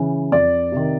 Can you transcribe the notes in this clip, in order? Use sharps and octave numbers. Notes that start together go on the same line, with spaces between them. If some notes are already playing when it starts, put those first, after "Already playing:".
Already playing: C#3 E3
F2 D5
C3 D#3